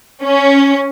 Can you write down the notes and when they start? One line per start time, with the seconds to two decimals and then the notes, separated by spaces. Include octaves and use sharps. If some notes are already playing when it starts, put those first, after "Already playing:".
0.23 C#4